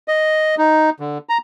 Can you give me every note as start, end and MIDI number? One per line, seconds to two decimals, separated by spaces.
0.08 0.55 75
0.58 0.90 63
1.00 1.18 50
1.29 1.38 82